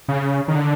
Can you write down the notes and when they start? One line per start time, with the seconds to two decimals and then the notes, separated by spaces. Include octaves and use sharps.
0.08 C#3
0.48 D#3
0.55 D3